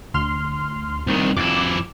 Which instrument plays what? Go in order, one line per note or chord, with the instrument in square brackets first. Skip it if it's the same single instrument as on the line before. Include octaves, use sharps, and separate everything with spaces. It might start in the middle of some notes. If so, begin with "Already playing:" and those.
[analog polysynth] D2 C6 F6
[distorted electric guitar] C2 D#3
[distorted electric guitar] F2 E4 [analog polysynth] D6